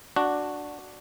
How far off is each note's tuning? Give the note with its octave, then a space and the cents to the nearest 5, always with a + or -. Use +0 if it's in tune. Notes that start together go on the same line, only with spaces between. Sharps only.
D4 +0 F#4 +0